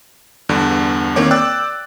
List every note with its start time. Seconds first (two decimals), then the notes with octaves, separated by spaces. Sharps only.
0.49 E2 G2 D3
1.16 D#3 A#3 C4 C#5 D6
1.31 D5 G5 D6 E6 F#6 A6